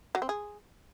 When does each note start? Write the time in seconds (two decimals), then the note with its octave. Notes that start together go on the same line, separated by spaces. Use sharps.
0.15 F#3
0.22 C4
0.29 G#4